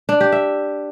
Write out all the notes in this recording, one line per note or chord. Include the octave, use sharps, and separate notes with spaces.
D4
G4
E5